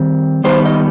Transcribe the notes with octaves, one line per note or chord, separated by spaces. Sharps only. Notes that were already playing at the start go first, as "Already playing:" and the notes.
Already playing: D#3 G3 C4
D#3 G3 B3 D#4 C5
D#5